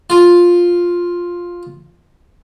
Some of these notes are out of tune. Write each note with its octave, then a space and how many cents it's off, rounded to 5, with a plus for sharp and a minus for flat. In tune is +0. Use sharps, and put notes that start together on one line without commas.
F4 +5